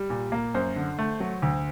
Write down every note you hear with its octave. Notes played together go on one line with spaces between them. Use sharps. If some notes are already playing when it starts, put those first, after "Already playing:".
Already playing: G3
A#2
A#3
F#2 C5
D3
A3
F#3
D2